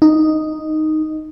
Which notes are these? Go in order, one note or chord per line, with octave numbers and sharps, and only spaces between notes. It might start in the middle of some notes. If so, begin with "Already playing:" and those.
D#4